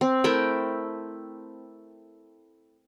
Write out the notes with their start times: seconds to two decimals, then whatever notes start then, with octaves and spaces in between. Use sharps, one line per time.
0.01 C4
0.24 A3 E4 A#4 G5